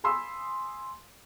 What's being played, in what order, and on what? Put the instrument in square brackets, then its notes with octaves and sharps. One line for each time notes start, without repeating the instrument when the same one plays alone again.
[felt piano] F5 G#5 B5 C6 D#6 E6